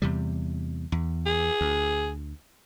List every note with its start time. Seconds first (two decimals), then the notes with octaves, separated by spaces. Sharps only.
0.02 E2 C3 G3
0.92 E2
1.26 G#4
1.61 D2